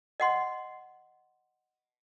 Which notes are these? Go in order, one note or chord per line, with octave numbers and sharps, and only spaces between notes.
D#5 F#5 C6